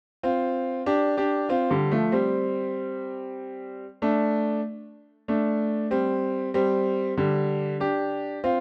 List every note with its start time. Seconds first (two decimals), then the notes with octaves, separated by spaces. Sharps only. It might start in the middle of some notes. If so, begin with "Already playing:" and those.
0.23 C4 F4
0.86 D4 G4
1.17 D4 G4
1.49 C4 F4
1.70 D3 G3
1.92 F3 A3
2.12 G3 C4
4.02 A3 D4
5.28 A3 D4
5.91 G3 C4
6.54 G3 C4
7.17 D3 G3
7.80 D4 G4
8.44 C4 F4